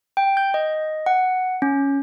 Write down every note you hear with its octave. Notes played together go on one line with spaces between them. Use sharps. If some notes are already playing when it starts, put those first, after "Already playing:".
G5
G6
D#5
F#5
C#4